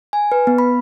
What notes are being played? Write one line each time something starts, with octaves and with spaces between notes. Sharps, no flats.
G#5
B4
B3
B5